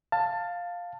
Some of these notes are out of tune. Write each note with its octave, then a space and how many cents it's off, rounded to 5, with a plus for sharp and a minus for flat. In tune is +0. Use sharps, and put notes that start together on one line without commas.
F5 +5 A5 +15